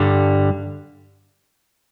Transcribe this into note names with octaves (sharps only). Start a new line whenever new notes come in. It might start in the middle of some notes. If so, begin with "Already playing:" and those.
Already playing: G2 D3 G3